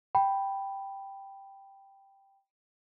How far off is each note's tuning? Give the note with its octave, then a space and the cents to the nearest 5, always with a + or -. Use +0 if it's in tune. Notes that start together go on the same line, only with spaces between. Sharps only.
G5 +0 B5 +0